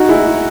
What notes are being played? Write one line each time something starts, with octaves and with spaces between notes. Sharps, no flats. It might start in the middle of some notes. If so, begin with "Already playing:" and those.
Already playing: D#4 F#4
E4 G#4